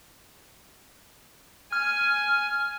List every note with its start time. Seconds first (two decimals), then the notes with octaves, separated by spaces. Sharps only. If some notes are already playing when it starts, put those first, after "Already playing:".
1.72 G#5 F6